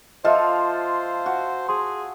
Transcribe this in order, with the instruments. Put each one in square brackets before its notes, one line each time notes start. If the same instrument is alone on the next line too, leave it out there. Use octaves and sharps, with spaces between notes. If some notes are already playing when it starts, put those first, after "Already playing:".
[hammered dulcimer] F3 F4 A4 [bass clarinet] C5 [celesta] D#5 E5
[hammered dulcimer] F#4
[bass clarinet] G#4 [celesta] C6